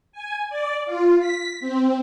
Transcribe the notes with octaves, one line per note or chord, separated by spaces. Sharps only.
G#5
D5
F4
B6
C4